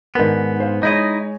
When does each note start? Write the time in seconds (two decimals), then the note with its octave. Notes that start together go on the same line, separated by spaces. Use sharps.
0.15 G#2 D#3 B3 D4 A#4
0.60 C5 F5
0.83 G#3 D#4 E4 C#5 D#5